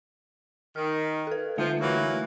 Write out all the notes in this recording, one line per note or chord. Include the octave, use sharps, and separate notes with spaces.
D#3 F6
A4 B4
D3 F3 A3 E5
E3 F#3 A#3